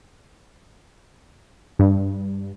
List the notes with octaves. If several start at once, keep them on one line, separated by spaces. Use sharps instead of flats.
G2